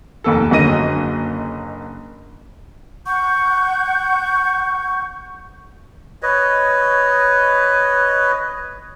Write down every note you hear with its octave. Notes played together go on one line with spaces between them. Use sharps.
F1 D#2 A4
F#1 D3 F#3 D#5 A#6 D#7
F#5 C#6 G6
B4 C#5 D#5